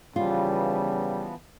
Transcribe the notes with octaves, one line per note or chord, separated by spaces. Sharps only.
C#3 E3 F3 G3 B3 F4